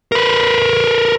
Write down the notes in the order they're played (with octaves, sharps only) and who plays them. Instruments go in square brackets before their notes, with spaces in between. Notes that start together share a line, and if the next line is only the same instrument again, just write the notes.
[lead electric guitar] A#4 B4